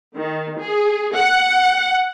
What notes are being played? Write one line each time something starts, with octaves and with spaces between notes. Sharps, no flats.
D#3
G#4
F#5